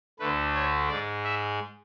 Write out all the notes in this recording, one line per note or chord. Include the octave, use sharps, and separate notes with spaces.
D2 D3 A3 B4
C#5
G#2 G#3 D5
E5